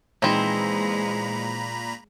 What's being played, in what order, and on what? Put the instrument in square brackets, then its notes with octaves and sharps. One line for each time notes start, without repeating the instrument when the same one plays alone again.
[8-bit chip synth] A#2 A#5 B5 [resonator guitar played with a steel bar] E3 D#4 [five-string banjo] F3 C4 [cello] G#3